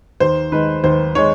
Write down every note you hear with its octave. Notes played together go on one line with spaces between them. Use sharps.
D#2 C5
D#3 G#3 B4
D#2 C5
D#3 G#3 C#5